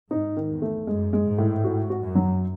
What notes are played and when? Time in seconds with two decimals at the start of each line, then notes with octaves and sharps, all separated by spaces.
0.11 G#2 D#4
0.37 D#3
0.49 E2
0.62 A3
0.87 F#2 G#3
1.13 G#3
1.25 G#2
1.38 A2
1.64 G#2 F#4
1.90 F#4
2.03 F#2
2.15 F#3